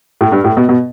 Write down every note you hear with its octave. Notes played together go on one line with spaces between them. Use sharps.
A2
G2
A2
B2
B2